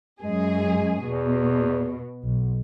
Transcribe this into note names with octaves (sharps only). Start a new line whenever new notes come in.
F#2 G#3 G#4
E2 B2
B1